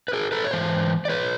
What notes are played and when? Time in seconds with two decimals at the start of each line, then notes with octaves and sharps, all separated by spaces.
0.08 B4
0.13 G#4 A#4
0.32 A4 B4
0.45 C#5
0.51 G#2 E3 C5
1.05 D5
1.09 B4 C#5